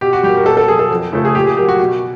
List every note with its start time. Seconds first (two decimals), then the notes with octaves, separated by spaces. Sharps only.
0.01 B2 G4
0.13 F#4
0.23 G3 A#3 G4
0.37 A#4
0.46 B2 A4
0.57 A4
0.68 A#3 G#4
0.71 F#3
0.79 A4
0.91 F2
1.12 C#3 F3 A3 A4
1.25 G#4
1.35 A#2 G4
1.46 G#4
1.57 F#3 A#3 G4
1.69 F#4
1.80 B2